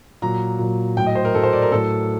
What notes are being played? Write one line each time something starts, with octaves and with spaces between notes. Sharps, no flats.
A#2 F#3 A#5
A#2 F#3
A2 F#3 G5
D#5
C5
A#4
A2 F#3 A4
C5
D5
A#4
A2 F#3 A4